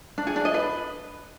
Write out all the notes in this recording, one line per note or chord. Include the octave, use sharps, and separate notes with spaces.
D4
G#4
D4
D#5
B4